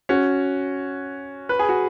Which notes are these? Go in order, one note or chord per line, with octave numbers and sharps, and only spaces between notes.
C#4 F#4
B4
G#4
F#4